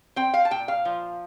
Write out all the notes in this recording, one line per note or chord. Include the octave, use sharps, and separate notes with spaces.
C4 G5
F5
A5
A#2 G5
F5
F3